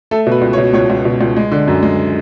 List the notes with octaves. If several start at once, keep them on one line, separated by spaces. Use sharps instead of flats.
A3 A4
B2
B4
C#2
C#5
B2
C#2 C#5
C#2
B2
C#2
G#3
D3
F#2
G#3